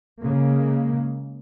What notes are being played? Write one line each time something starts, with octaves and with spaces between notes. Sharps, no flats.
C#3 G#3 A#3